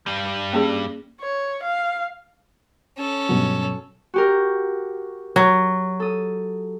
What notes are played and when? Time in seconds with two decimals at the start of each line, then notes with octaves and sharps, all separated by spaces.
0.06 G2 G3
0.53 A#3 C#4 G#4
1.21 C#5
1.63 F5
2.98 C#4 A4
3.29 G2 B2 F#3
4.14 F#4 G4 A#4
5.36 F#3
6.00 A4 D#6